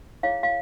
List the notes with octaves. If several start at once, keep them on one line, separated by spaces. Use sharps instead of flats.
E4 G#4 C#5 F5
F5